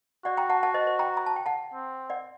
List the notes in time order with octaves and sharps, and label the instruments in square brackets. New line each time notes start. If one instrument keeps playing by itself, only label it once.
[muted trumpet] F#4 [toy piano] D5 F#5
[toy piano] G5 A#5
F#5 A5
F#5 A5
C5 D#5
C5
G5 A#5
A#5
A5
G5
F#5 A5
[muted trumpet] C4
[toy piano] D5 F#5